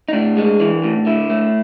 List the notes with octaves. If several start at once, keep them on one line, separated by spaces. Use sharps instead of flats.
D#4
A2 D4
G#3
E3
A2
D3 E4
A3